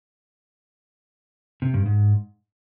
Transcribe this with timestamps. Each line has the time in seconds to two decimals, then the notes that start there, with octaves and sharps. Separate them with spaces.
1.62 C3
1.74 G2
1.86 G#2